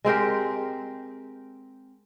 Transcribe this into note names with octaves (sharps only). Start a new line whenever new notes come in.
G#3 C4 G4 A#4